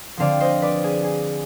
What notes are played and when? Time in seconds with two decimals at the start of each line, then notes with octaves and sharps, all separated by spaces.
0.17 D3 F3 C4 D5 F5
0.41 C5 D#5
0.62 B4 D5
0.84 G#4
1.04 G#4